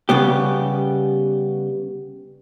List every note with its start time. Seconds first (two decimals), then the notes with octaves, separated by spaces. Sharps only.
0.09 C#3 G3 B3 G4